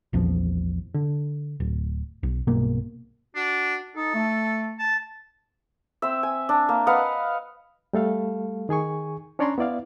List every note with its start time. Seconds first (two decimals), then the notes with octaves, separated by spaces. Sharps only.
0.13 A#1 E2 A#2 F3
0.94 D3
1.60 D1
2.23 B1
2.47 B1 G2 B2 A#3
3.35 D4 F#4
3.96 D#4 A4
4.15 A3
4.79 A5
6.02 C4 E5
6.23 G#5
6.49 D4
6.69 A#3
6.87 B4 D#5 F5 F#5
7.93 G3 A3 A4 F5
8.69 D#3 G#4 G#5 C#6
9.39 C#4 D4 C#5 D5 A#5 C6
9.58 B3 E4 D5 F5